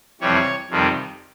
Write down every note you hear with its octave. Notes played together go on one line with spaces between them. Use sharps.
F2 C3 E3 G3 C#5
F2 C3 D#3 G3